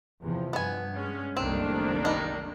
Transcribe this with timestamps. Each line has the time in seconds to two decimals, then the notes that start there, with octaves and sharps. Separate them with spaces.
0.22 E2 C3 F3
0.53 G2 B3 G#5
0.94 G#3 C#4
1.37 F#1 C2 D#3 A3 A#3 C4 D4
2.05 G3 D#4